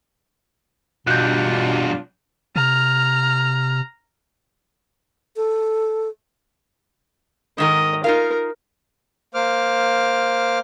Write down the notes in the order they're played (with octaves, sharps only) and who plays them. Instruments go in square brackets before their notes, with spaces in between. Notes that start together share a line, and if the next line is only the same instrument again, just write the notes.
[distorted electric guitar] E2 G2 [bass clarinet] B2 [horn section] D4 F4 [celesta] F#6 G6
[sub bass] C3 [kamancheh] A#5 F6
[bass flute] A4
[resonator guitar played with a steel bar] G#2 D#3 A#4 [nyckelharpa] D#5
[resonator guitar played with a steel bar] D#4 F4 F5 [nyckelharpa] A#4
[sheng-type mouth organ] A#3 C5 D6 F6